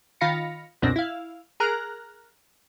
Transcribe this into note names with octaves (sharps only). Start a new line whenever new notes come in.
D#3 F4 F5 B5 A#6 C#7
C#2 F#2 B2 C4 D4 A#6
E4 F5
G#4 A#4 A#5 F6 F#6